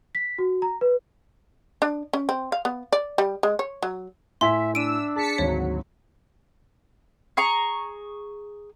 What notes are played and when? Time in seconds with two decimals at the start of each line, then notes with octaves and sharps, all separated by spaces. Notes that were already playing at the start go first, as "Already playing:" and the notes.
0.15 B6
0.38 F#4
0.62 A#5
0.81 B4
1.82 D4
2.13 C#4
2.29 C4
2.52 F5
2.65 B3
2.92 D5
3.18 G3
3.43 G#3
3.59 C#5
3.83 F#3
4.41 A2 E5 G#5 C6 B6
4.75 D4 E6 D7 D#7
5.16 G#4 A5 B6 C#7
5.38 G#1 D2 F#3 C#5
7.37 G#4 A#5 C#6